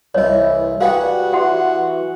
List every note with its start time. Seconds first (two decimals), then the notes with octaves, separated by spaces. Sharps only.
0.15 C2 E3 E4 C#5 D#5
0.81 G3 F#4 G#4 B4 F5 G5
1.33 E3 G4 F#5 C6